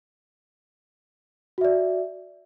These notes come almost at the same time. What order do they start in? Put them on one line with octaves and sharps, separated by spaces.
F#4 E5 D5